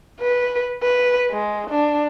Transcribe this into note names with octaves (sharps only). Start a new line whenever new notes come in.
B4
B4
G#3
D4